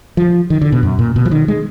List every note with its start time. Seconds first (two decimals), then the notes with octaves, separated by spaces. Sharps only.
0.17 F3
0.50 D#3
0.62 D3
0.72 B2
0.83 F#2
0.99 A#2
1.16 B2
1.25 F3
1.31 D#3
1.48 G#3